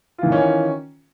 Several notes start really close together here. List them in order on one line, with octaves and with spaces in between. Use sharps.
F4 E3 D#3 C#4